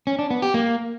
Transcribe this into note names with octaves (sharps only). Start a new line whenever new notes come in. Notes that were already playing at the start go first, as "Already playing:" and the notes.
C#4
D4
B3
G4
A#3